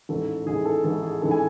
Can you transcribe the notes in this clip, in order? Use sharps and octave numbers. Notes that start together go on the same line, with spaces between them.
A1 G#2 E3 A4
A1 G#2 E3 G#4
A4
A1 G#2 E3 A4
G#4
A1 G#2 E3 A4
G#5